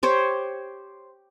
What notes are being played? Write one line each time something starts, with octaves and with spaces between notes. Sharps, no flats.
G4 C5 C#5